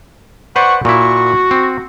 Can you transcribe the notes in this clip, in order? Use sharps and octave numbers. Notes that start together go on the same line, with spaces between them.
B4 C5 D5 F#5 C#6
A#2 E4 F#4 C#6
C4